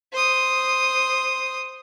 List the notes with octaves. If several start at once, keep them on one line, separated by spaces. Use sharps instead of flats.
C5 D#6